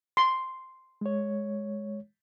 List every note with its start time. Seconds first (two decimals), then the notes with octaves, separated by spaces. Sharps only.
0.17 C6
1.01 G#3 C#5